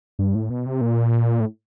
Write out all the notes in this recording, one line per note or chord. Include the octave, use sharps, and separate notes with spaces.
G2
A2
B2
C3
A#2
A2